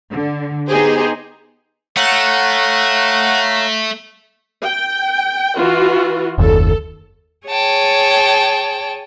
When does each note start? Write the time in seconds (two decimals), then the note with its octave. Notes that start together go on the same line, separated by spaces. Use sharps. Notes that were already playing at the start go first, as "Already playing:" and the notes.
0.11 D3
0.68 B3 D#4 G4 G#4 C5
1.97 A3 C#5 F5 F#5 A#5 D#7
4.64 G5
5.57 E3 F4 F#4
6.38 F#1 D#2 A4
7.47 G#4 C#5 G5 A5